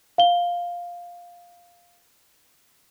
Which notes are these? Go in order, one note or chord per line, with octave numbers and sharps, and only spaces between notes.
F5 G7